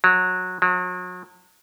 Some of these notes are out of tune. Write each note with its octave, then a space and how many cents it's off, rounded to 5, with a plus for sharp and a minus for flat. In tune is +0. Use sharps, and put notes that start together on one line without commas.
F#3 -20
F#3 -40